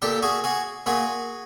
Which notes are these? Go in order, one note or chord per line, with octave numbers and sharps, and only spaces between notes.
A#2 G4 A4
F#4 G#4
F#4 G#4
A#2 F#4 G#4